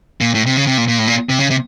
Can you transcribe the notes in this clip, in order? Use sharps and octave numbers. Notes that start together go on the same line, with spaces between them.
A#2
A2
C3
C#3
C3
A#2
A#2
A2
A#2
C3
C#3
C3